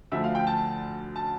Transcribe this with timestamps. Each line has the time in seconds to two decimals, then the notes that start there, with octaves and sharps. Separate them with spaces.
0.12 D2 D3 F3 E5
0.24 F5
0.35 G5
0.47 A5
1.16 A5